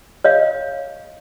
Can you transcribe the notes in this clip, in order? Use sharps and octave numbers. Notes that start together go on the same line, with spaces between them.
C#5 D#5 F5